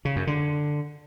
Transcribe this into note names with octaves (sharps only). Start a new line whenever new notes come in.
C#3
F#2
D3